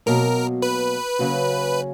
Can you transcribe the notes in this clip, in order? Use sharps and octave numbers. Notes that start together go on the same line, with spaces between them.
B2 F#3 A#3 A#4
B4
C#3 F#3 A#3 C#4 F#4